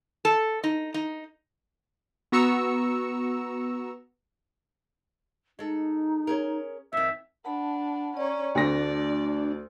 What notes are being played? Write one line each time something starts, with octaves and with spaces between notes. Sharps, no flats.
A4
D#4
D#4
B3 F#4 A#5 C#6 E6 C#7
G#3 D#4 A4
C#4 G#4 A#4
F2 D#3 E5
D4 F#5 A5 B5
C#4 C#5 D5 A#5
D2 A3 D4 F#4 D5 A#6